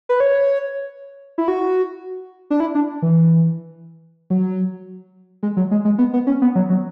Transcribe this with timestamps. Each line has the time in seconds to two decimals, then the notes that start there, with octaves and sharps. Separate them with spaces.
0.09 B4
0.20 C#5
1.38 E4
1.48 F#4
2.50 D4
2.60 E4
2.75 D4
3.02 E3
4.30 F#3
5.43 G#3
5.57 F#3
5.71 G#3
5.85 G#3
5.98 B3
6.13 B3
6.27 C#4
6.42 B3
6.55 F#3
6.70 F#3